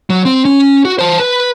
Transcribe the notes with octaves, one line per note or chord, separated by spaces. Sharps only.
F#3
C4
C#4
F#4
C5 A5
B4